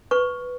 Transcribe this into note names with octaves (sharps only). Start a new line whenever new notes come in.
B4 C#6